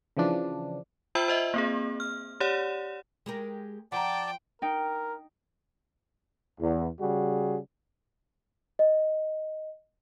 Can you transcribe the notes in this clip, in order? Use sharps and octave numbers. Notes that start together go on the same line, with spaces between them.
C#3 E3 F3 D4
F4 C5 E5 G5 B5 E6
C5 D#5 E5
A#3 C4 G#4
F6
G4 C#5 D5 F#5
G#3 G4 A#4
F3 D5 F#5 G5 A5 A#5
D#4 A#4 G5
E2
C#3 G3 F#4 G#4
D#5